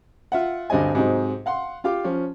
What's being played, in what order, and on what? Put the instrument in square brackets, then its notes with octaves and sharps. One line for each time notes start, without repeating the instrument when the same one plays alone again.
[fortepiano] F4 E5 F#5
D2 G2 C4 D#5 G#5
G#2 C3 F#3 C4 D#4
F5 F#5 C6
F4 G4 F5 D6
F3 C#4